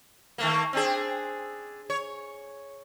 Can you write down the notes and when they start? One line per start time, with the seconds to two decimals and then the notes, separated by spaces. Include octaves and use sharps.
0.38 D#3 A3 A#3
0.73 C4 D4 G#4
1.90 C#5